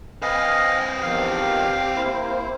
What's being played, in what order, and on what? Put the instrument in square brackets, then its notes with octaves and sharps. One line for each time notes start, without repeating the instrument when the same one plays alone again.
[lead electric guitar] C4 B4 [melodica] D#5 F5 [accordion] G5 G#5 F6
[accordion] E2 D#3 F3 [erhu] G4 [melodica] F5
[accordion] A#3 E4 C5